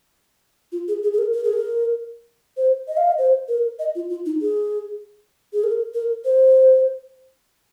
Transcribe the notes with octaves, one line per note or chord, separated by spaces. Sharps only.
F4
G#4
G#4
G#4
A#4
A#4
G#4
A#4
C5
D#5
F5
D#5
C5
A#4
D#5
F4
F4
D#4
G#4
G#4
A#4
A#4
C5